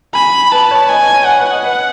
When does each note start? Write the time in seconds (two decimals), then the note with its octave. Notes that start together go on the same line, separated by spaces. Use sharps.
0.15 G#5 B5
0.52 B4 A5
0.71 C#5
0.89 D#5 G#5
1.02 C#5
1.14 C#5
1.27 D#5 F#5
1.39 B4
1.51 D#5
1.64 B4